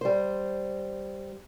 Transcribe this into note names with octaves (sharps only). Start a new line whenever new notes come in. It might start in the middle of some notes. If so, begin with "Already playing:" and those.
G3 C5